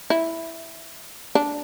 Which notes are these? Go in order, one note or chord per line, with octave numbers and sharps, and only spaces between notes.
E4
D4